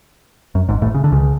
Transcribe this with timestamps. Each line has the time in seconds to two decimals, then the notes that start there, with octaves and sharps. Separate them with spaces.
0.55 F#2
0.69 G#1 G#2
0.82 A1 A2
0.94 C#3
1.04 D3
1.12 C#2 C#3